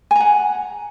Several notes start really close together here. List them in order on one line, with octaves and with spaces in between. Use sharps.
G#5 A#5 F#5